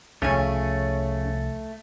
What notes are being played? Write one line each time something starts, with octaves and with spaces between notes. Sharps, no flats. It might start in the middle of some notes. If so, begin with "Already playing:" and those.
C2 C#3 F3 A3 C#4 G#5